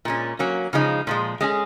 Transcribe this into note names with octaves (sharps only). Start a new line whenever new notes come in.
A#2 G#3 C#4
F#3 A#3 C#4
C#3 F3 G#3 D#4
A#2 F3 G#3
G#3 C#4 G#4